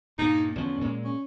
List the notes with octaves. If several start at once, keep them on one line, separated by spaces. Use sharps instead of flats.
G2 A#2 D#4
E2 D3 F3 C#4
A#2 G#3
C#4